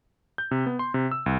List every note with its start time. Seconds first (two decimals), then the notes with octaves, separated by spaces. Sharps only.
0.38 G6
0.51 C3
0.66 B3
0.79 C6
0.94 C3
1.11 E6
1.26 C2